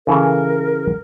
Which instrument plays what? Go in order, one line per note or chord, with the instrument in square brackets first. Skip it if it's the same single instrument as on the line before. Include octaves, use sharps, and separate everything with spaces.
[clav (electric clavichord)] C#3 E3 A4 [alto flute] A#4